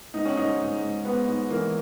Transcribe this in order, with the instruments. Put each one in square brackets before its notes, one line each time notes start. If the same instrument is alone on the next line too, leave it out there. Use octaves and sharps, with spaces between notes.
[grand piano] G#2 [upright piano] D#4
[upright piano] C#4
[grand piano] G#2 [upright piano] D#4
[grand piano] G#2
G#2
[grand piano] G#2 [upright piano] B3
[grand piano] G#2
[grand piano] E3 [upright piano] A#3